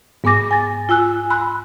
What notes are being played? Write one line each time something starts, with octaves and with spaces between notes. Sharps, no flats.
G#2 B3 G#5 D6 A#6
G#5 A6
F4 G#5 E6 F#6
B5 C6 E6 F#6